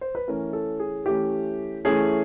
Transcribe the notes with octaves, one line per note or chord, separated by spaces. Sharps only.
C5
B4
E3 A3 C#4 A#4
A4
G#4
E3 A3 C#4 G4
E3 A3 C#4 G#4